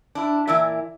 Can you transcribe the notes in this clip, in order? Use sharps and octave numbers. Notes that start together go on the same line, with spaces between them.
D4 E4
A#2 E3 E4 A#4 D5 E5